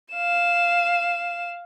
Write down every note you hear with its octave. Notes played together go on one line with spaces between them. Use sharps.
F5 E7